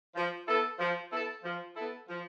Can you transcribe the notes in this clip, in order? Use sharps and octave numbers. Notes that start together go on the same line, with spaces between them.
F3
B3 E4 A4
F3
B3 E4 A4
F3
B3 E4 A4
F3